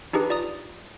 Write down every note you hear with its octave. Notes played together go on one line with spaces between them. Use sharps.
D4 D#4 G4 G#4 B4
F4 D5 A#5 D#6